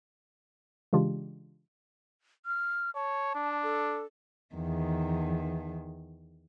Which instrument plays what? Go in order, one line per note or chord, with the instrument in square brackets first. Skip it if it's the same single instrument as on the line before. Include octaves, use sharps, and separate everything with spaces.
[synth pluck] C#3 E3 G#3 D4 F4 G4
[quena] F6
[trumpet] C#5 [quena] A5
[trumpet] D4
[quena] A4
[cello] E2 D#3